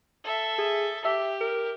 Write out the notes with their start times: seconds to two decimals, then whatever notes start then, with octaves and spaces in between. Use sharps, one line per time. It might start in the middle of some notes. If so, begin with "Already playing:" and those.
0.24 A4 E5
0.58 G#4
1.05 G4 E5
1.41 A#4